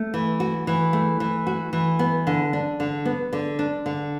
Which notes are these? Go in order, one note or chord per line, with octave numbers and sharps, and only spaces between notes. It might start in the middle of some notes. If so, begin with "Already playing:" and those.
Already playing: A3
E3
F#4
E3
A3
E3
F#4
E3
B3
D3
D4
D3
B3
D3
D4
D3